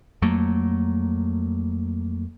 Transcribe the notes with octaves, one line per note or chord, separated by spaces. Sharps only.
F2 F#3 A3 A#3